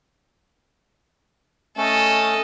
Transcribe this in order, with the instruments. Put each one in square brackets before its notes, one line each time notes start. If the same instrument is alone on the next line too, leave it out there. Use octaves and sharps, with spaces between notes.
[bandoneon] A3 C#4 [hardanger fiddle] A4 D#5